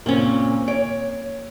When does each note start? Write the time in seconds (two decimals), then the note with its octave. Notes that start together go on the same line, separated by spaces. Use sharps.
0.06 A#2 C#3 A#3 C4 C#4
0.68 C#5 D6